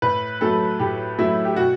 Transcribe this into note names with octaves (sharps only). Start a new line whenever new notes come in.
A2 B4
F#3 A3 A4
A2 G4
F#3 A3 E4
G4
B2 F#4